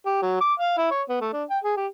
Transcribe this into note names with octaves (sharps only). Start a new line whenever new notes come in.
G4
F#3
D6
F5
E4
C#5
B3
A3
D4
G5
G#4
G4